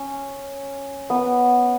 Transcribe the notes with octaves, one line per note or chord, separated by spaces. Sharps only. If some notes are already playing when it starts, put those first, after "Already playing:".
Already playing: C#4
B3